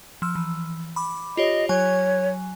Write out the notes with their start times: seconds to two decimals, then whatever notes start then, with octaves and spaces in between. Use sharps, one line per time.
0.22 F3 E6
0.35 E3
0.96 B5 D6
1.37 F4 G4 C#5 D#5
1.69 F#3 C#5 G#5